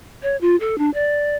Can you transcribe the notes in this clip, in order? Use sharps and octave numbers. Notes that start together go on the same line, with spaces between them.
C#5
F4
A4
D4
D5